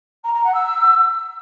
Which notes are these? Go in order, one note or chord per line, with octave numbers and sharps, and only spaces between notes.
A#5
A#5
F#5
E6